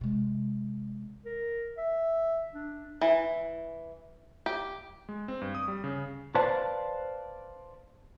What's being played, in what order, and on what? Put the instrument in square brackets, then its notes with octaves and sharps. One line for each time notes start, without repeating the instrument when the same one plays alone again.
[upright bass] C3 G#3
[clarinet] A#4
E5
D4
[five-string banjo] E3
G4
[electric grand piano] G#3
C4
G2
D#6
G3
C#3
[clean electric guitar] B4 C5 D5 F5 A5